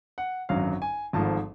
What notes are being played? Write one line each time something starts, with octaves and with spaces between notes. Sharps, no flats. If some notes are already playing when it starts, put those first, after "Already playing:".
F#5
G#1 F#2 D3 F#3 F5
G#5
G#1 G#2 F3 A3 A5